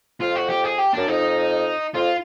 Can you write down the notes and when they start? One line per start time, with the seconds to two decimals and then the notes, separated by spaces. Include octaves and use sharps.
0.21 F2 F4
0.36 F#4
0.50 G4
0.65 G#4
0.79 G4
0.94 F#2 D4
1.08 F2 D#4
1.95 F2 F4